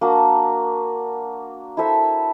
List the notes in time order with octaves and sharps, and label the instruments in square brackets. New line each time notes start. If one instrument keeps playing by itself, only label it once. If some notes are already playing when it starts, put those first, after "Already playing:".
[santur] A#3 D4 F#4
E4 A4 C5 E5